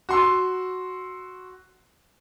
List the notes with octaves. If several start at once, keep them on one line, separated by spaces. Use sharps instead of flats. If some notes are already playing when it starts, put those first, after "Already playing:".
F#4 C6 E6